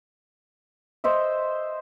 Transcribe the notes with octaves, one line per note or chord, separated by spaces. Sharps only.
C5 D#5 E5